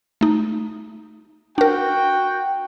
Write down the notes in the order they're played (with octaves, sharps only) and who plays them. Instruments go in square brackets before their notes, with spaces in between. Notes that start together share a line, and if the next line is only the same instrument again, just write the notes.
[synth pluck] A3 D#4
[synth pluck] D4 A#4 [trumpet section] F#4 G5